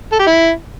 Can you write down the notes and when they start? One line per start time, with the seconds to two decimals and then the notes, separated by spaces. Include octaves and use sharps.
0.12 A4
0.19 G4
0.27 E4